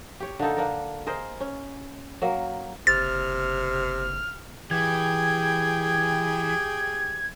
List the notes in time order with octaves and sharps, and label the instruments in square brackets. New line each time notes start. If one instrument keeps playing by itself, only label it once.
[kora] G4 C#5
D3 A#3 D#4 A4
A#3 D4 A#4
G#4 A#4 C5 D#5
C#4
F#3 A#3 A#4
[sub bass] F#1 [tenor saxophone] C3 [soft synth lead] F6 [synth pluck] A6
[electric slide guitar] E3 [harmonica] G4 G#4 G5 [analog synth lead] G#6